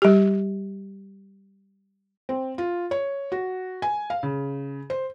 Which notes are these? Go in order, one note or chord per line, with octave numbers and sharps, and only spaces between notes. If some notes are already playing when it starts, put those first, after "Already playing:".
G3 G4
C4
F4
C#5
F#4
G#5
F5
C#3
C5